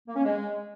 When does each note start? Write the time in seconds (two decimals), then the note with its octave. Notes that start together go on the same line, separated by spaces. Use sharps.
0.07 A#3
0.16 C#4
0.24 G#3